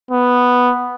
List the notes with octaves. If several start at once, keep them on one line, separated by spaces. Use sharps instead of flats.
B3